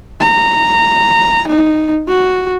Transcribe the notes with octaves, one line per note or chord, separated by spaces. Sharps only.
A#5
D#4
F#4